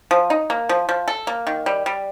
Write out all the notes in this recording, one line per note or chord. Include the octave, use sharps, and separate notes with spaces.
F3
D#4
A#3
F3
F3
A4
A#3
D#3
G3
G3